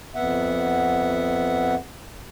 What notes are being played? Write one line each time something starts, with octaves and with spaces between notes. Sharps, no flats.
F2 B3 E5 F#5